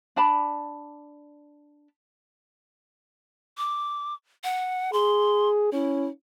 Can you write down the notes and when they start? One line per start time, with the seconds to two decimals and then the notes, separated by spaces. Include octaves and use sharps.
0.16 D4 D5 A5 B5
3.58 D6
4.44 F#5
4.93 G#4 C6
5.73 C#4 E4